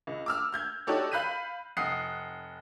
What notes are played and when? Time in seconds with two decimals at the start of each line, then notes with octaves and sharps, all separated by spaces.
0.07 C#2
0.26 D6 E6 F6
0.52 F6 G6 G#6
0.87 D#4 F#4 G4 A4 C#5 D5
1.12 F5 B5 F#6 G6 B6 D#7
1.77 F1 F#5 D#6 C7